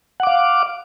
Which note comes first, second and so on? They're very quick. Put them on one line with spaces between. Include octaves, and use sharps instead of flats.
F#5 D6 F5